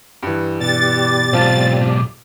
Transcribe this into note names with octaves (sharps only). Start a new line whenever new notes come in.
G2 E3
B2 G4 D5 A6
B1 G#2 C4 F4 A5